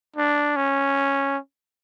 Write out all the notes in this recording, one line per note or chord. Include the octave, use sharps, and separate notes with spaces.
D4
C#4